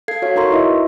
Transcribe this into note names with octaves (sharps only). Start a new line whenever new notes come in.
A4 F5 G#6 C7
F#4 C#5 F5
D#4 F#4 A#4 A#5 C6 C#6
E4 B4 D#5 E5